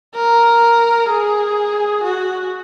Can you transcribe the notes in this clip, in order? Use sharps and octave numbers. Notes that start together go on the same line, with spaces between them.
A#4
G#4
F#4